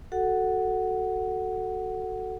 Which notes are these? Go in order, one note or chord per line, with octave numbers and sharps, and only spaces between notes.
F#4 A4 F#5